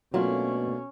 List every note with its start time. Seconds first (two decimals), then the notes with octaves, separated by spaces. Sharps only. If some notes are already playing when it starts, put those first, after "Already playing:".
0.14 B2 F#3 A3 A#3 C#4 D4 F4